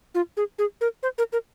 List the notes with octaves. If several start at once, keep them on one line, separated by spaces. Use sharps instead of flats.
F4
G#4
G#4
A#4
C5
A#4
A#4